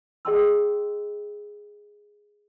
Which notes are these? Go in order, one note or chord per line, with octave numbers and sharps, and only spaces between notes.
G#4 D#5 G5 A5 C6 E6